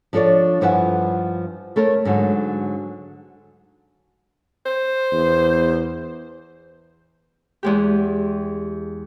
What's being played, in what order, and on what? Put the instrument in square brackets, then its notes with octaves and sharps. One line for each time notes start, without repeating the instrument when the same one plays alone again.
[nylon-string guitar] F3 D4 A4 C#5 D5
G2 F3 E4 B4 F#5 G#5
A3 A4 A#4 C#5
G#2 D3 F#3
[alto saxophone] C5
[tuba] E2
[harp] E2 G#3 G4